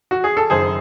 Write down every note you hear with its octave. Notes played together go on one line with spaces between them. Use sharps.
F#4
G#4
A4
F#1 F#2 D#3 G#4 C5